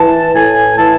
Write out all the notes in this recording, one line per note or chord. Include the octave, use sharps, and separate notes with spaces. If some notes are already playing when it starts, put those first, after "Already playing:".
Already playing: E3 A5
A2 G#5
E3 A5